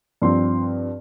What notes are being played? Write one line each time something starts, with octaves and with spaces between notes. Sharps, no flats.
G2 F3 C4 C6